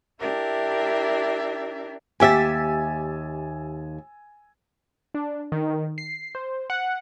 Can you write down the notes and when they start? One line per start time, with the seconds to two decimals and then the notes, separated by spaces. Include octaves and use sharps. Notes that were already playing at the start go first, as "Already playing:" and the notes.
0.19 D4 E4 G4 A#4 E5
2.20 D#2 G4 E5 G#5 E6 A6
5.14 D4
5.52 D#3
5.98 C7
6.35 C5
6.70 F#5